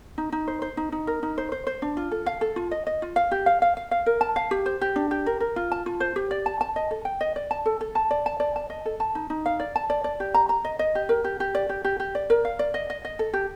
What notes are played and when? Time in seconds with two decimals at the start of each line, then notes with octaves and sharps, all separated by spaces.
0.18 D#4
0.32 D#4
0.47 C5
0.62 C5
0.77 D#4
0.92 D#4
1.07 A#4
1.23 D#4
1.38 C5
1.52 C5
1.67 C5
1.82 D4
1.97 F4
2.11 A4
2.26 F5
2.41 A4
2.56 F4
2.71 D#5
2.87 D#5
3.02 F4
3.16 F5
3.31 G4
3.46 F5
3.62 F5
3.77 F5
3.91 F5
4.06 A#4
4.21 A5
4.36 F5
4.51 G4
4.66 C5
4.81 G4
4.96 D4
5.11 G4
5.26 A#4
5.40 A#4
5.56 F4
5.72 A5
5.86 F4
6.00 C5
6.16 G4
6.31 D5
6.46 A5
6.61 A5
6.76 D#5
6.91 A4
7.05 G5
7.21 D#5
7.36 D5
7.51 A5
7.66 A4
7.81 A4
7.95 A5
8.11 D5
8.26 A5
8.40 D5
8.56 A5
8.70 D#5
8.85 A4
9.00 A5
9.15 D#4
9.30 D#4
9.46 F5
9.60 D5
9.76 A5
9.90 D5
10.04 D5
10.20 G4
10.34 A#5
10.49 A#5
10.65 D#5
10.79 D#5
10.95 G4
11.09 A#4
11.24 G4
11.40 G4
11.55 D5
11.69 G4
11.84 G4
12.00 G4
12.15 D5
12.30 A#4
12.45 F5
12.59 D5
12.74 D#5
12.90 D#5
13.05 D#5
13.19 A4
13.33 G4